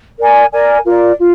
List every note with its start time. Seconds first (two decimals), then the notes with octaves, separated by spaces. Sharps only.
0.18 A#4 D5 G#5
0.52 A#4 D5 G#5
0.85 F4 A#4 D5
1.19 F4